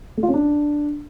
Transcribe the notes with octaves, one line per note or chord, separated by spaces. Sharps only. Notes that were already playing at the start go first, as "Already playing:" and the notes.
A3
F4
C#4
D4